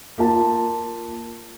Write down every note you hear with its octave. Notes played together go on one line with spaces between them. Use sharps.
A#3 F4 A5